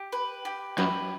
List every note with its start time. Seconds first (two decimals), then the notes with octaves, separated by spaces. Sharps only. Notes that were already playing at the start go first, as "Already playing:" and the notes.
Already playing: G4
0.12 B4
0.45 G4
0.78 F#2 B4